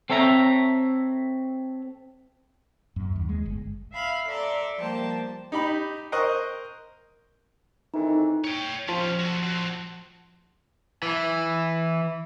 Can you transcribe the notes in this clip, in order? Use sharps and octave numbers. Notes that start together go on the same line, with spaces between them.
C4 A4 C#5 E5 A#5
F#2
D#2
G#3
G1
E5 F5 B5 F6
A4 D5 E5 A#5 C6
F3 G3 A#3 C5 G5 A5
D#4 G4 B5
A#4 C5 D#5 C#6 D#6 F#6
F2 D#3 E3 D#4
C#5 G5
F3 G3 C#4 A5 C6
D3 F#4
C4 F#4
E3